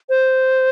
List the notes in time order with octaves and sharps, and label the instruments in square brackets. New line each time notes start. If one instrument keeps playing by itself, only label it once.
[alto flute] C5